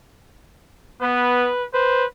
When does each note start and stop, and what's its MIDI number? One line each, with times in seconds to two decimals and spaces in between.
1.02 1.48 59
1.02 1.65 71
1.74 2.06 71
1.74 2.03 72